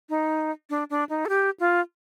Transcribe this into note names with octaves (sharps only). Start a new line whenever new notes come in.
D#4
D4
D4
D#4
A4
G4
F4